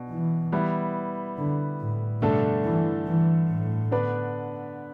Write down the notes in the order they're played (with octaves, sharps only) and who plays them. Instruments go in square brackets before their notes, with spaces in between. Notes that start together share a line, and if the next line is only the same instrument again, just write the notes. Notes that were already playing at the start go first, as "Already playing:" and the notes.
Already playing: [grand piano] B2 D4
[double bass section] E3
[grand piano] G3 B3 E4 B4
[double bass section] D3
A2
[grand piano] G2 D3 A3 D4 A4 [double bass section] B2
[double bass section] E3
E3
A2
[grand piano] D3 B3 D4 B4 D5